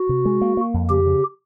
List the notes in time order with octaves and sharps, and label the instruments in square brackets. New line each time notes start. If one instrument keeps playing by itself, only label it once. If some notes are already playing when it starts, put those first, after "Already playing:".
Already playing: [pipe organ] F#4
[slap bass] C3
G#3
A#3
A#3
F2
[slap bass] C#3 [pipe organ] G4
[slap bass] C#3